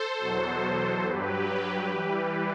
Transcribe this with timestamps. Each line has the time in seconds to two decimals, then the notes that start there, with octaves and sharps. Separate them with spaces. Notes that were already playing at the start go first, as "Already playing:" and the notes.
Already playing: A4 C5
0.19 E2 B2 F#3
1.05 G2 F#3 G4 B4
1.90 E3 G3